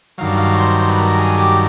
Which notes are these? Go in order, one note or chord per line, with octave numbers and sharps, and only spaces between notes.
G2 D#3 F#3 F5
F5
C#5
C5
C5
B4
A#4
G#4
G4